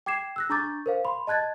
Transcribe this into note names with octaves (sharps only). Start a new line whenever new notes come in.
G5 D6 G#6 C7 E7
E6 F#6 A#6
D4 A#5 C#6 D6 G6 A6
A#4 C5 F5
B5 C6
D#5 A5 F#6 G#6 A6